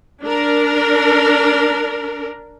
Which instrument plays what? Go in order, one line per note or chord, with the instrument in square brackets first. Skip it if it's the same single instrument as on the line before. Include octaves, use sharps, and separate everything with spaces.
[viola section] D4 A#4